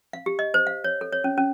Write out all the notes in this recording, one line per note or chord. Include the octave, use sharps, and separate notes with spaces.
F5
G4
D#5
C5
F5
C#5
A4
C#5
C#4
C#4